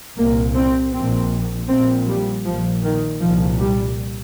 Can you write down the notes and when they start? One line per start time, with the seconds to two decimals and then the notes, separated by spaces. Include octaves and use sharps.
0.17 C2 A#2 A#3
0.55 C4
0.93 A#1 A#2 C4
1.69 A#1 A#2 C4
2.07 G3
2.45 A#1 A#2 F3
2.84 D#3
3.21 C2 A#2 F3
3.60 G3